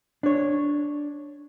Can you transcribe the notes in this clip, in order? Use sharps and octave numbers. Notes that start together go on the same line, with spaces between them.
D4 C#5